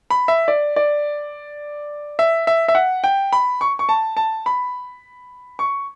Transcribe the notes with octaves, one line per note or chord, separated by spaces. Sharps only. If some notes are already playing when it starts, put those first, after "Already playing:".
B5
E5
D5
D5
E5
E5
E5
F#5
G5
B5
C#6
C#6
A5
A5
B5
C#6